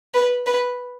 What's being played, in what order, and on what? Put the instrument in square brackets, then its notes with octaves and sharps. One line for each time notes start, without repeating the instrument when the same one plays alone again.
[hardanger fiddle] B4
B4